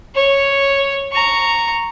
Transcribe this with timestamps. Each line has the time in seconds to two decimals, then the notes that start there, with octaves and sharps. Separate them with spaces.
0.15 C#5
1.12 A#5 C#6